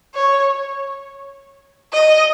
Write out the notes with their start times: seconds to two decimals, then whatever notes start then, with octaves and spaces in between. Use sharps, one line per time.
0.15 C#5
1.93 D#5